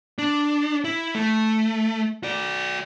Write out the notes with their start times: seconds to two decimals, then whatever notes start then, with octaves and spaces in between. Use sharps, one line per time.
0.19 D4
0.85 E4
1.15 A3
2.23 F#4 D5